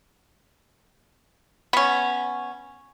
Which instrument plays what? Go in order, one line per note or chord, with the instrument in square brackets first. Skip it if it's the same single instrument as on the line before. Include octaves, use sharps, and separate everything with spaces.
[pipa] B3 C#4